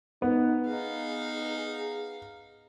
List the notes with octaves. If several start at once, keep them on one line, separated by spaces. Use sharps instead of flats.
B3 D#4
D#4 G#4 F5